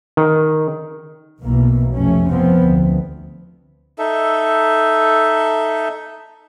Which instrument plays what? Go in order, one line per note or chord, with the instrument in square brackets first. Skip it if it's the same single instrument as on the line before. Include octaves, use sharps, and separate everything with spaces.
[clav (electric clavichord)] D#3
[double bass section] B1 B2 E3 A#3
F1 A3 C#4
F3 B3 C4
D2
[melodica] D#4 A4 E5